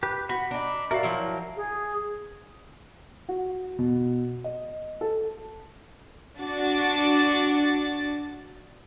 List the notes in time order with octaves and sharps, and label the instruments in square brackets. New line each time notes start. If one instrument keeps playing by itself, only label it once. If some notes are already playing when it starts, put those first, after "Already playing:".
[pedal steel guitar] G4 B4
[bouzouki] F#4 [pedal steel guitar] B5
[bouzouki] D4 D#4
[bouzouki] F#4 D5 E5 [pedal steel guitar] A#4 F5
[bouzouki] F3 F#3 E4
[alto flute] G#4
[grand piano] F#4
B2
D#5
A4
[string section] D4 F#4 A6